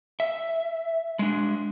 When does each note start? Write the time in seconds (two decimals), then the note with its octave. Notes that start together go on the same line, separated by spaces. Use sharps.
0.20 E5
1.19 G#3 D4